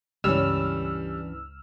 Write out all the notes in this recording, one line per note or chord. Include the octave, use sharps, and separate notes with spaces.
C#2 G2 E3 G3 C#4 E6 F6